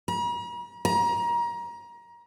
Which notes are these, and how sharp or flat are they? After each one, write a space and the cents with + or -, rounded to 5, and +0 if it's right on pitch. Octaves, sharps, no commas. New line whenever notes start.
A#5 +45
A#5 +25